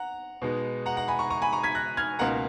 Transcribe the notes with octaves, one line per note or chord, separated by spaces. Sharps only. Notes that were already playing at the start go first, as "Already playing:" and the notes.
Already playing: F#5 A#5
B2 G#3 B3 D#4
F#5 A#5
F#5 A#5
G#5 B5
A#5 C#6
A#5 C#6
G#5 B5
A#5 C#6
G#6 B6
F#6 A#6
F6 G#6
C#2 B2 A#3 D#4 F#5 A#5